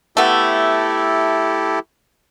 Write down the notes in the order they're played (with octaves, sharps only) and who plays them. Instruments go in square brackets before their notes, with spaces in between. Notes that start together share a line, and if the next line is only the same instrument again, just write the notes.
[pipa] A3 B3 [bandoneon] E4 G4 A4